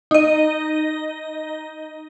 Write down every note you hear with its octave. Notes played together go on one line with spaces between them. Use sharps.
D#4 D#5